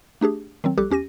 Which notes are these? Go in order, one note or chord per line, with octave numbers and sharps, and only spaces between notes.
A3 D4 G4 G#4
D#3 F#3 C4
A#1 G3 G4 A4 D6 F#6
E2 C#4 G4 A#6 D#7